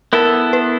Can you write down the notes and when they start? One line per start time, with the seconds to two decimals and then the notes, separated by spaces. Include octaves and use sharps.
0.13 B3 E4 A4 A#4
0.53 B4